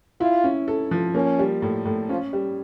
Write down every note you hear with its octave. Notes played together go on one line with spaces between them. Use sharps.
E4 F4
C#4
A4
F3
A#3 C#4
G3
A2
A2
F3 C#4
G3